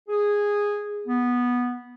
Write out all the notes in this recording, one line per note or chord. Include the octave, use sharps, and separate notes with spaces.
G#4
B3